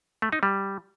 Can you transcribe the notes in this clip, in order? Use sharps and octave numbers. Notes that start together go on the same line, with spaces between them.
A3
D#4
G3